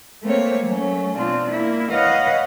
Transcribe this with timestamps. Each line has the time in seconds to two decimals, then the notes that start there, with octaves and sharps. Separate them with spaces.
0.23 A3 A#3 C4 C#5
0.66 F#3 A3 C#4
1.15 B2 C4 D4 F4
1.50 A#3 E4
1.89 B4 C#5 D#5 F5 F#5